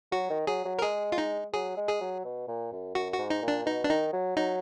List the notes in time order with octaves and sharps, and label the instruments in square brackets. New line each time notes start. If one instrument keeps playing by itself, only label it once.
[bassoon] F#3 [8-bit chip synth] F#4
[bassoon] D#3
[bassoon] F#3 [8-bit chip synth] G#4
[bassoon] F#3
[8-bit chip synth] A#4
[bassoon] G#3 [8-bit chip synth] G#4
[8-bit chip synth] F4
D#4
[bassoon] F#3 [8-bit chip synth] G#4
[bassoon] G#3
[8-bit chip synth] G#4
[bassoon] F#3
B2
A#2
F#2
[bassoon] F#2 [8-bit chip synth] F#4
[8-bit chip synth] F#4
[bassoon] G#2
[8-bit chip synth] D#4
[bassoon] A#2
[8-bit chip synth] D4
[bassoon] B2 [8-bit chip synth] D#4
[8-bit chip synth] D4
[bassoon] D#3 [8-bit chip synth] D#4
[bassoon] F#3
[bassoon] F#3 [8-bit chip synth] D#4